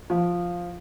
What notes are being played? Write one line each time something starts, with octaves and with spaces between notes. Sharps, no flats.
F3